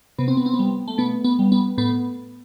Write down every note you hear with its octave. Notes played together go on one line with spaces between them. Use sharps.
C3 B3
C4
B3
C4
B3
G3
A3
B2 B3
B3
G3
B3
A2 B3